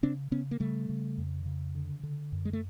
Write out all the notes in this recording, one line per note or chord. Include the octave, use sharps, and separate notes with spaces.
C#3 C4 D4
C#3 B3 C#4
A#3
C#3 G3 A3
C#3
F2
C#3
D3
D3
F#2
G#3
A3